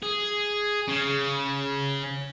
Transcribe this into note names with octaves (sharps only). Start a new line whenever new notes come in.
G#4
C#3